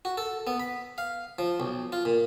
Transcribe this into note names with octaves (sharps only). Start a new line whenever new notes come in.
F#4
A4
B3
B5
F5
F3
B1
F4
A#2